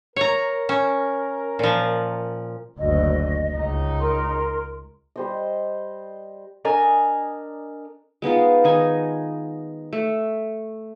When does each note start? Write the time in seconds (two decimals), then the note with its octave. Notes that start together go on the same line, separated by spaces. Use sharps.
0.16 A#4 C#5 A#5
0.69 C#4
1.59 A#2 F3
2.79 F#1 D2 D#5
3.55 C#2 D#4
3.99 A#4 C6
5.16 G3 C5 D#5
6.65 D4 A#4 D#5 G#5
8.22 G#3 B3 D#4 F4
8.64 D#3 D#4 G#5
9.93 A3